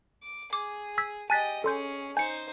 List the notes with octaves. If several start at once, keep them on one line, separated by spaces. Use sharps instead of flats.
D6
G#4 D6
E6 G#6 B6
G4 D#5 G#5 A5 F#6 A6 B6
C#4 G#4 A4 C6 G6
D#4 C5 G#5 G6 C#7